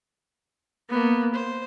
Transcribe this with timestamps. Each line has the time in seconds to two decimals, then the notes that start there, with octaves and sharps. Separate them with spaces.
0.89 A#3 B3
1.34 C5